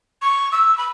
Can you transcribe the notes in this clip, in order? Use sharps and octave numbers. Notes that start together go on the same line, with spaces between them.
C#6
E6
B5